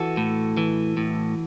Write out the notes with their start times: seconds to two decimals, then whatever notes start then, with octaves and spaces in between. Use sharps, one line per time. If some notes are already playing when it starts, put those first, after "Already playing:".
Already playing: E3 F#4 A4
0.17 A2
0.57 E3
0.97 A2